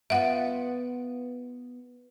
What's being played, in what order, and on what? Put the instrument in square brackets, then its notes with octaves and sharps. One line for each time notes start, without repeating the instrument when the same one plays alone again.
[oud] B3 F4 B4 [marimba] E5 F#5